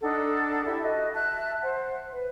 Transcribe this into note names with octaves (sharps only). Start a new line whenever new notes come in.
D4 D#4 A4 F#5
E4 G4 A4 E5
F#4 D#5
E5 A5 F#6
C5 F#5
B4